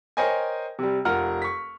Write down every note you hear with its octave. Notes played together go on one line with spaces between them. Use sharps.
A#4 C5 C#5 D#5 G5 G#5
C3 G3
F1 F4 A#4 F#5 F6
C#6 B6